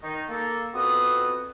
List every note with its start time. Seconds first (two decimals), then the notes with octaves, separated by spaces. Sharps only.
0.02 D#3 D#4
0.28 A#3 A4
0.74 F2 B3 C4 F#4 F#5 D#6